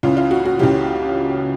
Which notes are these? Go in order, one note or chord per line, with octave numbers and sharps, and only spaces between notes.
C#2 C#3 E3 F4
F4
F#4
F#4
C#2 C#3 E3 G4